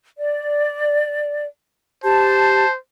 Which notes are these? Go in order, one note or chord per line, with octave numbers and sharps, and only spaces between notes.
D5
G4 C5 A5